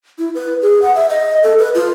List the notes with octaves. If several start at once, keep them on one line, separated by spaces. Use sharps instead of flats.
E4
B4
G#4
F#5
E5
D#5
A4
B4
F4